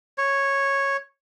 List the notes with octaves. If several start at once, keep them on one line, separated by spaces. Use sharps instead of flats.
C#5